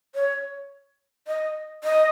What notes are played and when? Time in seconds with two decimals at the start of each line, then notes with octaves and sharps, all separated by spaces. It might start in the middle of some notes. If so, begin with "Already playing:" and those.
0.15 C#5
1.28 D#5
1.84 D#5